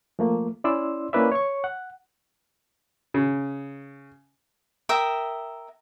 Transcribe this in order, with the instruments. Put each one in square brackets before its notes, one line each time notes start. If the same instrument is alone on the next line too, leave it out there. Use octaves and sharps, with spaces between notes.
[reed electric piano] F3 A3 A#3
C#4 E4 D5 C6 E6
A#3 C#4 E4 B4 D5 E5
C#5 C#6
F#5
[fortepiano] C#3
[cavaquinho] A#4 E5 G5 D#6